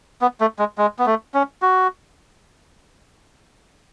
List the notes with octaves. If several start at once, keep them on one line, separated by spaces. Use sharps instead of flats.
B3
A3
G#3
G#3
B3
A3
C#4
F#4